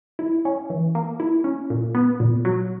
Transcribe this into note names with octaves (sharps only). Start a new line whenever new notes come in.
E4
C#4
E3
A#3
E4
C#4
A#2
B3
A#2
F#3